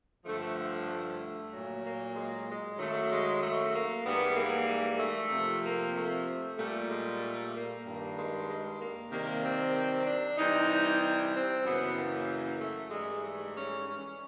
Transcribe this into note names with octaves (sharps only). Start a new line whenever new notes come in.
G2 D3 F3 A3
A3
A3
A#2 F#3
A#3
G#3
G#3
F#2 D#3 F#3 A3
G#3
A3
A#3
G#2 E3 G3 B3
A#3
A3
C3 F3
A#3
A3
A#2 G3 A3
G#3
A3
A#3
G2 D#3 G3
G#3
G#3
A#3
C3 D#3 G3 A#3
C4
C4
D4
C3 E3 G3 D#4
C4
F#2 C#3 E3 B3
A#3
A3
G#2 E3 G3 G#3
A3
C#4
C#4